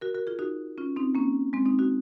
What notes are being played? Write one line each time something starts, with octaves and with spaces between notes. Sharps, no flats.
F#4 A#4
F#4 A#4
F4 G#4
D#4 F#4
C#4 F4
C4 D#4
A#3 C#4
G#3 C4
C4 D#4
D#4 F#4